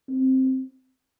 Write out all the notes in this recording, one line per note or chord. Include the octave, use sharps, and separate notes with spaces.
C4